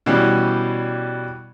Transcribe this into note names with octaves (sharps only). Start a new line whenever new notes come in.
B2 E3 G3 C#4